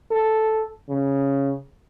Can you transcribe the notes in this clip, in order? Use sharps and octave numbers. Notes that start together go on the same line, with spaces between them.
A4
C#3